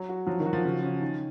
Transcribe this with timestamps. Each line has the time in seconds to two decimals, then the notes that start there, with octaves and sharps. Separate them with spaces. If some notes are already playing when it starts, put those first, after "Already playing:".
Already playing: F#3
0.09 F#4
0.26 F3 F#3
0.40 D#3
0.46 F#4
0.53 F3
0.65 C#3
0.83 C#4
1.01 D#3